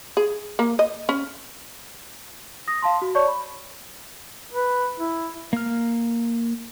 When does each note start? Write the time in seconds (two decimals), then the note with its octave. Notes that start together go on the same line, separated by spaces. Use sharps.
0.17 G#4
0.59 A#3
0.79 D#5
1.09 C#4
2.68 D#6 A#6
2.82 F5 A5 C6
3.02 F#4
3.15 C#5 D5 A5 C#6
3.28 B5
4.52 B4
5.00 E4
5.53 A#3 F6